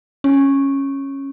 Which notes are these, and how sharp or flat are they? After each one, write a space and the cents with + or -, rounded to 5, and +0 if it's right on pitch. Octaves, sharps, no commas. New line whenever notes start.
C#4 -10